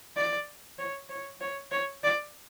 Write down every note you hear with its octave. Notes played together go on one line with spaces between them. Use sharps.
D5
C#5
C#5
C#5
C#5
D5